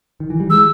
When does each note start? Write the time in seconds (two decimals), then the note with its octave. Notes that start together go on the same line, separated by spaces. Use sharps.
0.20 D#3
0.30 E3
0.40 G3
0.50 G#3 E6